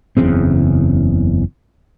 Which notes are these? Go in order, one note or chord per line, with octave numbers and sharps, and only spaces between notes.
F#1 E2 C#3 C4